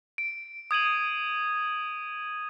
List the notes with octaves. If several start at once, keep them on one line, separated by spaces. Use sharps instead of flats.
D7
D#6 G#6 D#7 F#7